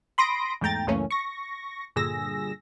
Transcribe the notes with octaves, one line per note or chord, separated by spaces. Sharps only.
B5 C6 D#6 A#6 D7
E2 G#2 A3 G5 A#5 A6
C#2 F#2 E3 A3 A#3 C#4
C#6 A#6
G2 A#2 D3 G#4 E6 A#6